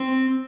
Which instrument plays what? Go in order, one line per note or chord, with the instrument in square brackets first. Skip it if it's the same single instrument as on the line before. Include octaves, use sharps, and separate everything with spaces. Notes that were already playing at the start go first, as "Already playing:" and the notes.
Already playing: [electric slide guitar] C4